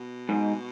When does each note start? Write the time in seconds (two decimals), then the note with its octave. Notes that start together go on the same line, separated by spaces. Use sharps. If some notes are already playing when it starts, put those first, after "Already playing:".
Already playing: B2
0.29 G#2